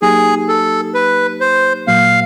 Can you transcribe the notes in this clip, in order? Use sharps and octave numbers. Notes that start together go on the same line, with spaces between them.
F#3 A#3 D#4 G4 G#4
A4
B4
C5
A#2 F#3 A#3 F5